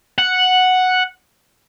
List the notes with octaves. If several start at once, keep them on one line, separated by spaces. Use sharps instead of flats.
F#5